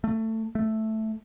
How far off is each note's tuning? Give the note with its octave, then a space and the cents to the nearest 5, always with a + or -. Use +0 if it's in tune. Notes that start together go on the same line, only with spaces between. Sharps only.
A3 +20
A3 +0